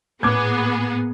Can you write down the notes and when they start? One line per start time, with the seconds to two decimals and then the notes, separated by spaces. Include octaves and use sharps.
0.23 A2 A#3 B3 G#4 D6 G#6